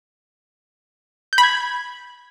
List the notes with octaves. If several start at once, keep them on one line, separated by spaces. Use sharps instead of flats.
G6
B5
G#6